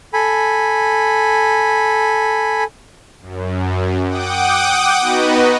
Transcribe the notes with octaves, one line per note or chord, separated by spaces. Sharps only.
A4 G#5 B5
F#2
F#5 G5 D6 D#6
B3 D#4 F#4 B4 D#5